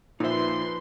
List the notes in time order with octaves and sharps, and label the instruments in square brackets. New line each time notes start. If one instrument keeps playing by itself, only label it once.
[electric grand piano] A#2 C5 [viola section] F3 B4 C6 [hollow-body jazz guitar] D#4 E5